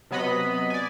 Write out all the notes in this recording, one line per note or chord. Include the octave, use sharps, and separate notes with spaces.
C3 F#3 B3 D#5 B5
D5 G#5